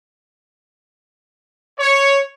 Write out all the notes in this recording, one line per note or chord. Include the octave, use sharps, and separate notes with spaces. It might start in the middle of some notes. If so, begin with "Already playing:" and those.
C#5